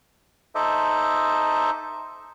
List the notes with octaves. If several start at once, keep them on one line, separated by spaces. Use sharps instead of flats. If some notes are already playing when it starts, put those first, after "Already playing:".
D#4 A4 C5 D#5 E5 D6